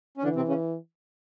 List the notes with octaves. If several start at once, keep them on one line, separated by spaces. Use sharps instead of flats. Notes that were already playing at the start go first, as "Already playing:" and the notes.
C#4
D3 E3 D4
C3 C4
C#3 C#4